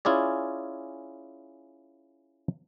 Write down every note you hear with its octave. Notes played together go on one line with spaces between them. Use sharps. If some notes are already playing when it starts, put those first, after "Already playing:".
C#4 E4 F4 G#4 D5